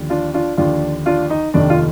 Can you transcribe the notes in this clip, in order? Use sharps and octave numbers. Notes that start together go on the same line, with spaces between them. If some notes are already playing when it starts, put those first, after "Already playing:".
Already playing: D#2 D3 F3
D4 F4
D4 F4
D#2 D3 F3 D4 F4
D4 F4
D#4
F1 D#2 D#3 D4
F4